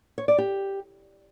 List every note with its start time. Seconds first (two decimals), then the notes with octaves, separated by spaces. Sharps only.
0.18 C#5
0.28 D5
0.38 G4